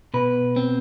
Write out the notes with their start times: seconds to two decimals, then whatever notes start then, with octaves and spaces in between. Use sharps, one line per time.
0.14 B2 B4
0.56 C4